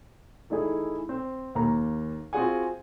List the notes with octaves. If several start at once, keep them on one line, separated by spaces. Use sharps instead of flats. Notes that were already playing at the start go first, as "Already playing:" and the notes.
E3 A3 D#4 E4 G#4
C4
D#2 A#3 A#5
C4 F4 F#4 G#4 F#5 G#5